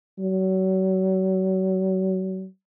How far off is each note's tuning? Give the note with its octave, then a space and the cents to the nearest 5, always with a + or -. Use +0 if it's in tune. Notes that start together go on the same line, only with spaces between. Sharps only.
F#3 +35